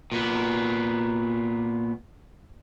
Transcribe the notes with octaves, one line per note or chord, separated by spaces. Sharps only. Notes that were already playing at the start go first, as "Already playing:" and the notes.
A#2 B3